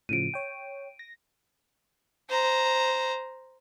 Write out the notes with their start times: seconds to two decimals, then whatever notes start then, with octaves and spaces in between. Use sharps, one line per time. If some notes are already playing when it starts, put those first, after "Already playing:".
0.09 A2 C#3 F3 D7 D#7
0.34 C#5 G5
0.99 A#6
2.29 C5 A#5